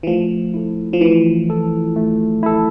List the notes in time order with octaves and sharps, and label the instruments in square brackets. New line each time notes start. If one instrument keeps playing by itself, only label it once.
[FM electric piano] E3
[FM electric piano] F3 [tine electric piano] A3
[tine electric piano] E4 A4
[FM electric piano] F3
[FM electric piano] E3 [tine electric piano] A3
[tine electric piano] E4 A4
A3
E4 A4